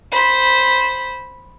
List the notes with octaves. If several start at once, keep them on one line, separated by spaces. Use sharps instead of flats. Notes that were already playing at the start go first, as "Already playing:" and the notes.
C5 B5